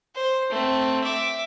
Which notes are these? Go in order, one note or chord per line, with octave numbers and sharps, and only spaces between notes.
C5
A3 C4
E5 D6